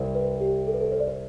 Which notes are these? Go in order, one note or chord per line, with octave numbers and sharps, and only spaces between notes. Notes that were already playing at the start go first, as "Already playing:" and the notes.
Already playing: C2
B4
G4
A4
B4
A4
C5
D5
C5